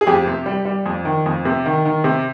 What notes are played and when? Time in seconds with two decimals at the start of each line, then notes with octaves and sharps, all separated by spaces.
0.01 G#4
0.07 F2 G4
0.27 C3
0.46 G3
0.65 G3
0.86 F2
1.05 D#3
1.26 F2
1.45 C3
1.66 D#3
1.85 D#3
2.04 C3